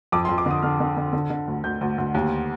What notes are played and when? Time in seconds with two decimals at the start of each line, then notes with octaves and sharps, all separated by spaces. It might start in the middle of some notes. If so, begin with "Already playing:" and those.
0.12 F2 D6
0.25 C6
0.29 F2
0.38 D6
0.46 D3 D#6
0.62 D3 F6
0.80 D3
0.97 D3
1.13 D3
1.30 D3
1.48 D2
1.64 D2 G6
1.81 D2
1.98 D2
2.15 D#2